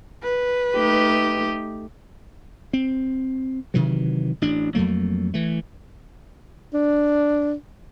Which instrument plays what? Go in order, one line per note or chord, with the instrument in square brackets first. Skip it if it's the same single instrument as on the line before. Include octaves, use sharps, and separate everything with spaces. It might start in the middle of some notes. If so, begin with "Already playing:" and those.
[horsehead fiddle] B4
[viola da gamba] A3 D#4 G4
[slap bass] C4
C3 D#3 E3 F#3
A1 D4
F2 F#3 A3 A#3
E3 A3
[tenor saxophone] D4